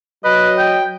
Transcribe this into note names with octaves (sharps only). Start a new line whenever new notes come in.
F#3 B4 D#5
G5